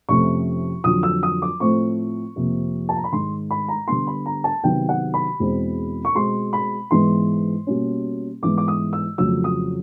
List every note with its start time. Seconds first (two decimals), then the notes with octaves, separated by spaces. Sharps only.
0.09 F2 C3 F3 A3 C#4 C#6
0.84 F2 D3 F#3 D#6
1.03 E6
1.23 D#6
1.42 D6
1.60 A2 F3 A3 C4 C#6
2.36 F2 C3 F3 A#3
2.89 A5
2.96 A#5
3.04 B5
3.12 G#2 D#3 G#3 C6
3.51 B5
3.68 A#5
3.88 D3 G3 B3 C6
4.07 B5
4.26 A#5
4.44 A5
4.63 C3 D#3 F#3 B3 G5
4.89 F#5
5.14 B5
5.40 E2 B2 G#3 C4
6.05 C#6
6.15 B2 G#3 C4 C6
6.53 B5
6.91 G#2 E3 G#3 B3 C6
7.67 B2 G3 A#3 C#4
8.42 G#2 E3 G#3 B3 D6
8.58 D6
8.68 D#6
8.93 E6
9.18 F2 C#3 F#3 A3 E6
9.44 D#6